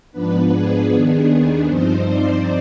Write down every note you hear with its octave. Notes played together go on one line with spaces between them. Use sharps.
G#2 F3 B3 D4 B4
G#4
D#2 D#3 B3 D4 G#4
G#4
G2 F3 C4 D#4 C5
D5